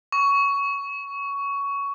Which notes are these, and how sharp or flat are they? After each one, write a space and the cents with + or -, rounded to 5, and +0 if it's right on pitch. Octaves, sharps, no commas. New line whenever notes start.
C#6 +15